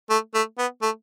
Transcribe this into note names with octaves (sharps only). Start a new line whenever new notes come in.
A3
A3
B3
A3